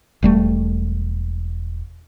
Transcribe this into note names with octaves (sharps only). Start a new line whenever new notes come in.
E1 G3 A3